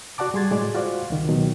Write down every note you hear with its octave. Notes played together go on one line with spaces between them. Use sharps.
F#4 D5 F#5 A5 D6
G3 G#4 C6 G#6 A6
A2 G#3 F#4 D5
F4 F#4 C5 D5
C#2 D#3
B2 D#3 F#3